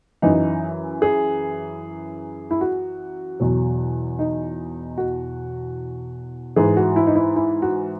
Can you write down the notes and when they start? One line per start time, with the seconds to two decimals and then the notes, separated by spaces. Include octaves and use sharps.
0.22 F#2 E3 D#4
1.02 G#4
2.51 E4
2.61 F#4
3.40 E2 B2 F#3
4.19 D#4
4.98 F#4
6.56 G#2 E3 G#4
6.77 F#4
6.96 E4
7.07 D#4
7.15 E4
7.36 E4
7.62 F#4